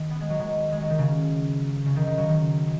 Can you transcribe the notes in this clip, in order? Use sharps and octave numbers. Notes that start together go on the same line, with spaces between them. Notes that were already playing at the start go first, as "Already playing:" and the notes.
Already playing: D#3
B3
G#3
F#3
D#3 G#3
G#3
F#3
D#3
C#3
C#3
D#3
D#3
C#3 F#3
D#3